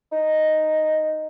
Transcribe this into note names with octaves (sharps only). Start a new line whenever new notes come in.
D#4